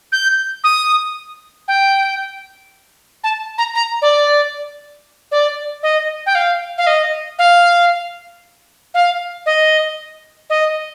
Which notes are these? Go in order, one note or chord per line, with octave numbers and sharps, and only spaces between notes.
G6
D#6
G5
A5
A#5
A#5
D5
D5
D#5
G5
F5
F5
D#5
F5
F5
D#5
D#5